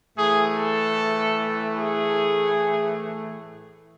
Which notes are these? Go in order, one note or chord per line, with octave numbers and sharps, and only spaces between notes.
A2 E3 A3 G#4
A4
G#4